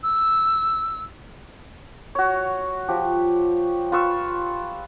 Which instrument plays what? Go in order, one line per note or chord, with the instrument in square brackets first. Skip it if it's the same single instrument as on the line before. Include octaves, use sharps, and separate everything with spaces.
[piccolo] E6
[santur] F#4 C#5
F3 G4
F4 B4 C#6 E6